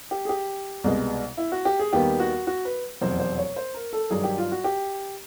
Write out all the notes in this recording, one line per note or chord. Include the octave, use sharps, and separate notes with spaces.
G4
G#4
G4
C2 B2 G#3 B3
E4
F#4
G4
G#4
D#2 D#3 G3 B3 G4
F#4
F#4
B4
F1 E2 B2 F#3 C5
C5
C#5
C5
A#4
A4
G2 D#3 F#3 G#4
G4
F4
F#4
G4